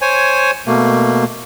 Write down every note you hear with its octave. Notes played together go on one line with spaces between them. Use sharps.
C5 C#5 G#5
B2 A3 A#3